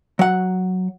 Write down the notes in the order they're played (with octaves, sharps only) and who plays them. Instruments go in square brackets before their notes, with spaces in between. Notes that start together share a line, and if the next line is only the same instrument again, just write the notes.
[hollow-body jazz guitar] F#3 F#5